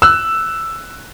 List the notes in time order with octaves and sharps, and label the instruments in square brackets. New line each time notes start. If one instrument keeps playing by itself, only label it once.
[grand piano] E6 F#6